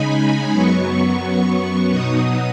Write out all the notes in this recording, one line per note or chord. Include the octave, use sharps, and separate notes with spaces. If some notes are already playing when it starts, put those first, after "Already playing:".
Already playing: C#3 G#3 D#4 G#5 B5
F#2 F#3 B3 C#6
B2 F#3 B3 D#4 D#6